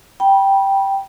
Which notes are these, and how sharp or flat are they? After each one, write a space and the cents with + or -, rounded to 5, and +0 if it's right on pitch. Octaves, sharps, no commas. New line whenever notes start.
G5 -5 B5 -30